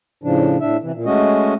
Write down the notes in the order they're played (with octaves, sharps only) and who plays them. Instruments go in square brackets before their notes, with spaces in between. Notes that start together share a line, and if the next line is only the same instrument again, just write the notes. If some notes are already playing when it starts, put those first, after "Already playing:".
[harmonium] A2 C#3 F3 D4
A2 D4 E5
C3 E3
A#2
G#3 A3 C#4 F#4 D#5